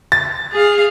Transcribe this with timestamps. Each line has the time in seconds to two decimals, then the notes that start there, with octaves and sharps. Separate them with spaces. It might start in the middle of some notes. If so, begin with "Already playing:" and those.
0.12 A6
0.52 G#4 F5